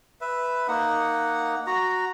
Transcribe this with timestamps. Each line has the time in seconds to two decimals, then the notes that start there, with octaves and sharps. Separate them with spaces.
0.21 B4 E5
0.68 A#3 D#4 F#5
1.67 F#4 A#5